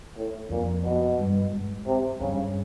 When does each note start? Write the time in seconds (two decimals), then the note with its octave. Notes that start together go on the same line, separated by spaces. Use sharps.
0.16 A2
0.49 F2 A#2
0.84 B2
1.18 G2
1.53 G#2
1.86 C3
2.20 G2 C#3